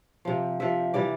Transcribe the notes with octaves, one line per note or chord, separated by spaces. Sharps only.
C3 F3
C3 F3 E5
C3 E3 G3 D5